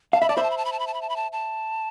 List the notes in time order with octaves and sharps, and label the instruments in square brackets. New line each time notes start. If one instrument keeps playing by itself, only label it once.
[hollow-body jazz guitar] F5 [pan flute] A5
[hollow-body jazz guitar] E5 [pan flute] B5
[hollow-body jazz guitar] D5 [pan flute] A5
[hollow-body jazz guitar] C5 E5 [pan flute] B5
[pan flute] A5
B5
A5
B5
A5
B5
A5
B5
A5
B5
A5
A5